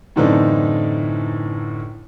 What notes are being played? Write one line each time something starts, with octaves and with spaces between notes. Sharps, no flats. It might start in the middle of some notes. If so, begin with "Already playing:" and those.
F#2 A2 D3 E3 C4 D#4